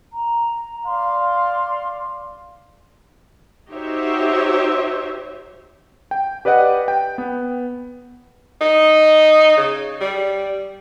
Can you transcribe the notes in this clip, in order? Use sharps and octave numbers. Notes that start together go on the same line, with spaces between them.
A#5
D5 F5 C6
D#4 F#4 G4 C5 C#5 E5
G5
G4 B4 D5 D#5 F#5
G5
B3
D#4
C#3
G3